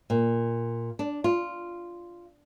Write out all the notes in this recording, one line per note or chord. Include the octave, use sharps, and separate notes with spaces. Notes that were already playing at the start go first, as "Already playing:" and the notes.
A#2
D4
F4